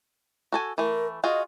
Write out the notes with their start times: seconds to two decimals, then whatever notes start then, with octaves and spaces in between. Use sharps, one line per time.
0.52 F#4 A4 G#5
0.78 E3 A3 A#4
1.24 F4 F#4 G#4 D#5